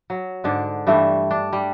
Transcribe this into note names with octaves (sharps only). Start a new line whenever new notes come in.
F#3
G#2 D3 D4
G2 E3 G3 A3
D4
G3